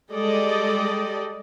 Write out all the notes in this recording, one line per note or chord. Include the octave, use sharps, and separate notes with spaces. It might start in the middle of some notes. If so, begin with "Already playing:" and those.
G3 G#3 G4 A4 D5 D#5